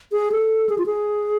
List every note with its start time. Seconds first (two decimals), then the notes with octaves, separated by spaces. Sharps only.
0.12 G#4
0.32 A4
0.69 G#4
0.78 F4
0.86 G#4